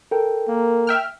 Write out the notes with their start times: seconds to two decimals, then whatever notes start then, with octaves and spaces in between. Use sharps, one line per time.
0.11 A4 A#4 G5
0.48 A#3
0.87 E5 G5 F6